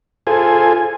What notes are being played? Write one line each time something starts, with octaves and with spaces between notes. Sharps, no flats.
F4 G#4 A4 C5 G#5